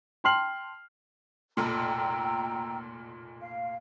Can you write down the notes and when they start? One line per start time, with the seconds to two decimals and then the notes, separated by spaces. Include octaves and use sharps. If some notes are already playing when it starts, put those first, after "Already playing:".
0.24 G5 A5 C6 F6 C7 F#7
1.57 F1 B1 A#2 G5 A#5 E6
3.41 F5